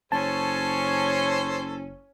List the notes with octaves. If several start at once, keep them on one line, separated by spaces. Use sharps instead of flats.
F#1 C#4 A4 C5 C#5 A5